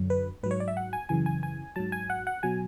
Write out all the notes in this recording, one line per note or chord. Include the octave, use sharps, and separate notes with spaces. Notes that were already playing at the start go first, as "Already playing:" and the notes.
Already playing: F#2 D3 F#3
B4
G#2 F#3 B4
C#5
D5
E5
F#5
G#5
F#2 C#3 E3 G#5
G#5
G#5
G#2 F#3 A5
G#5
F#5
F#5
B2 F#3 G#5